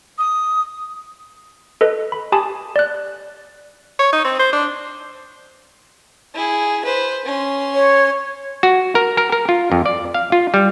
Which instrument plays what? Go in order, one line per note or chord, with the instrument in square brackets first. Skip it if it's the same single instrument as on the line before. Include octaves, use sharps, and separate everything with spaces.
[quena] D#6
[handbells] A4 B4 D#5
B5
G4 G#5 A5 B5 D6 D#6
D5 F#6
[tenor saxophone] C#5
D#4
C4
C5
D4
[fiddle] E4 G#4
B4 C5
C#4 C6
[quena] C#5
[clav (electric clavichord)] F#4
A#4
A#4
A#4
F4
F2
D5
F5
F4
G3